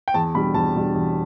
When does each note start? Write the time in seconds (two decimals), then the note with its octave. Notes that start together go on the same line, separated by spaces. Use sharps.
0.08 G5
0.14 E2 A5
0.34 B2 G3 D4 B5
0.54 E2 A5
0.75 B2 G3 D4
0.95 E2